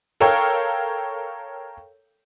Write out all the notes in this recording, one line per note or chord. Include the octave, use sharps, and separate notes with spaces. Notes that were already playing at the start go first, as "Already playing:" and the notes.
A4 A#4 C#5 F5 G5